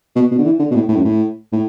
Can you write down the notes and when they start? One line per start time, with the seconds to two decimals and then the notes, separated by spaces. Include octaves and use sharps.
0.15 B2
0.31 B2
0.38 D3
0.46 E3
0.59 D3
0.71 B2
0.75 A2
0.89 A2
0.97 F#2
1.05 A2
1.52 A2